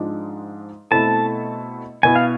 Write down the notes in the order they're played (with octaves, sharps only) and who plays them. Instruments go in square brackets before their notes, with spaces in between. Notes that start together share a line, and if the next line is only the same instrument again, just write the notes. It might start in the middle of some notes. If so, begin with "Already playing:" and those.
Already playing: [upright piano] G#2 F3 G#3 D4
[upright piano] B2 A3 C4 E4 A4 [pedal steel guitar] A5
[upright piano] B2 B3 E4 [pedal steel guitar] G#5
[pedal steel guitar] F5